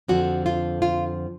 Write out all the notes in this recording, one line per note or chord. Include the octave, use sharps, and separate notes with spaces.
F2 D3 F3 F#4
F4
F4